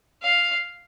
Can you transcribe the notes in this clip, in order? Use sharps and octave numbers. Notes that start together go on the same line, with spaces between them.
F5